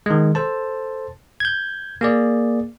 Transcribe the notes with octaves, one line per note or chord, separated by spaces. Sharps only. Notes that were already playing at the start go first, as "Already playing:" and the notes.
D#3 G#3
A4 C5 A5
G6 G#6
A#3 G#4 D5